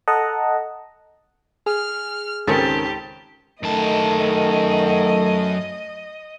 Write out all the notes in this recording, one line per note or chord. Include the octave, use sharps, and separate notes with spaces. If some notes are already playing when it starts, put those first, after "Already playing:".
A4 D#5 F#5 A5 A#5
G#4 F6
C#2 G#2 D#3 C4 C#4 G4 A4 A5
F#2 D#3 A3 D#5 A5